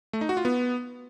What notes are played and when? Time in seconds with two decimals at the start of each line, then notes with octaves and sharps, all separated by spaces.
0.13 A3
0.21 D#4
0.29 F#4
0.37 F4
0.45 B3